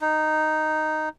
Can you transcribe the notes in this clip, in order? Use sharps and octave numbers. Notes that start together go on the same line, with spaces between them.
D#4